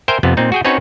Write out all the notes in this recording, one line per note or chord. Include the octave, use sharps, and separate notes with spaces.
A#4 C5 E5 G5 G#5
F2 C3 B3
A#2 C4 D#4
F#4 G#4 G5
C4 C#4 D#4 F#4 B4 C#5